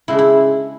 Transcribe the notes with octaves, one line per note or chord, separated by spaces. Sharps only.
C#3 G#3 D4 E4
E4